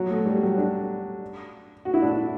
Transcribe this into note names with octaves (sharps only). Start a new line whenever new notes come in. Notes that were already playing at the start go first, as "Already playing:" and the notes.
Already playing: F#3
A3
G3
F#3
D4
F#4
E4
D4
E4